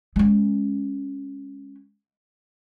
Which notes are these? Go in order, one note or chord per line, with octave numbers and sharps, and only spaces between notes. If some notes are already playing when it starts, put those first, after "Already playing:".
G#3 C#4